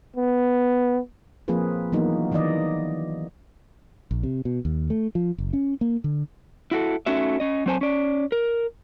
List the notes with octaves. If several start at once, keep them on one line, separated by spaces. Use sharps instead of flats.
B3
F3 A#3 C4 F4 G#4 B4
E3 F#3 A#3 B3 D#4 F#4
D#3 E3 D#4 D5 D#5
A#1
C3
B2
D#2
A3
F3
F#1
C#4
A#3
D3
E4 F#4 A4
A3 C#4 D#4 F#4 E5
C#4 D#5
F#3 C4 C5 G#5 A5
C#4 D5
A#4